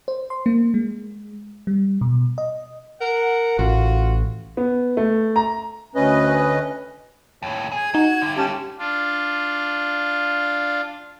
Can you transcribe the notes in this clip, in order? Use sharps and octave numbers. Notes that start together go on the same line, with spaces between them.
C5
C6
A#3
G#3
G3
B2
D#5
A#4 F#5
A1 F4 F#4
B3
A3
A#5
D2 C#4 B4 D#5
D#2 A2 C#5
G#4 G#6
D#4 F#4
G2 D3
C#4 G4 A5
D4 F4